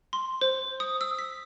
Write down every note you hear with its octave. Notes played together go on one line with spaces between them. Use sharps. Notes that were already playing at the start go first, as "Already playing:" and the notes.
C6
C5
D#6
E6
B6